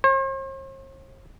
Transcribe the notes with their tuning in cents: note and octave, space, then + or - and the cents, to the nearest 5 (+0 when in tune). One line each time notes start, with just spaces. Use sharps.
C5 +45